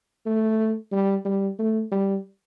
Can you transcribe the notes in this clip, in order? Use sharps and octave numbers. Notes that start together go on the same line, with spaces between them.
A3
G3
G3
A3
G3